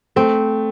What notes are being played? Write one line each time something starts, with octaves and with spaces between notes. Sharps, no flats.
A3 C4